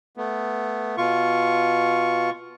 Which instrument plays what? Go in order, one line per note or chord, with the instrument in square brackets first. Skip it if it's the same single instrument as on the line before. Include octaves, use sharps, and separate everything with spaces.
[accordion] A3 B3
B2 F4 C#6